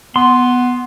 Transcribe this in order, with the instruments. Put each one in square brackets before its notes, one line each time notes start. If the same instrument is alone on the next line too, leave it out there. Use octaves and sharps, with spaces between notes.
[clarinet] B3 [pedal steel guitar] C6